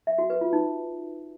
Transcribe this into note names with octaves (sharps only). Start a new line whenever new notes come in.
E5
F#4
B4
F4
D#4